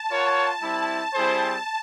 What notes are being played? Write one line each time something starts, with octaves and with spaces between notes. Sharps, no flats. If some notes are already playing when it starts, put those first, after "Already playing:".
Already playing: A5
F4 A#4 C#5 F#5
G3 C4 E4 A5
G3 C4 E4 G#4 C5